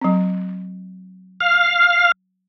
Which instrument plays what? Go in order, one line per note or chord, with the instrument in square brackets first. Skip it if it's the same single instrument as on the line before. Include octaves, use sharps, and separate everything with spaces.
[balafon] F#3 C4
[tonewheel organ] F5